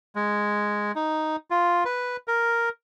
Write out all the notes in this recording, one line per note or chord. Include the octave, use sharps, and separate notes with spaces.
G#3
D#4
F4
B4
A#4